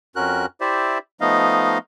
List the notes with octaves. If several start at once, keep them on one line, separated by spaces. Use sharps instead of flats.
F2 C#4 F#4 A#4 F#6
E4 G4 C5 D5 E5
F3 A3 B3 D#4 D#5 F5